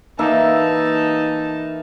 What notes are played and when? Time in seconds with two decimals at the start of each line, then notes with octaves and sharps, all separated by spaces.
0.19 E3 A#3 D#4 E5 A5